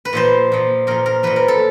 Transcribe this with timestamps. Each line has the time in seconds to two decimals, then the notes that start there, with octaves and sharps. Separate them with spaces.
0.05 B4
0.13 A#2 F3 C5
0.52 A#2 F3
0.87 A#2 F3 A#4
1.06 A#4
1.23 A#2 F3 B4
1.36 A#4
1.48 A4